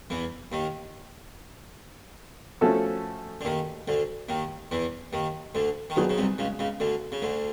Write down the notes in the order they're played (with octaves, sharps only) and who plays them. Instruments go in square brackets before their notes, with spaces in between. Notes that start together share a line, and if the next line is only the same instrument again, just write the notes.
[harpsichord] E2 E3
D#2 D#3
[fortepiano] F3 A3 C#4 F#4 A4
[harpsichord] D3
D#2 D#3
D2 D3
D#2 D#3
E2 E3
D#2 D#3
D2 D3
D#3
[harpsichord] D2 D3 [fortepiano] F#3 B3 D#4 G#4
[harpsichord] C#3
C2 C3
C#2 C#3
C#2 C#3
D2 D3
C#3
D2 D3